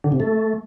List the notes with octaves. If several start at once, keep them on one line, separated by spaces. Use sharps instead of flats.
D3
C3
A3